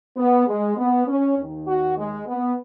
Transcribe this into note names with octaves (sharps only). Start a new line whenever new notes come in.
B3
G#3
B3
C#4
D#2 D#3
F#4
G#3
B3